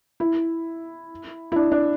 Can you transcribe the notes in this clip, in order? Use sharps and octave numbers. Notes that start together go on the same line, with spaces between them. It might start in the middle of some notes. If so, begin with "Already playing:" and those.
E4
E4
D4
D4